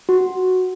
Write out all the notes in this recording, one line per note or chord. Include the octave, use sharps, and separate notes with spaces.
F#4